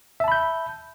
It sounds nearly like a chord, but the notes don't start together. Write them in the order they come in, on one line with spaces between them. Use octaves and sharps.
E5 A5 B5 G6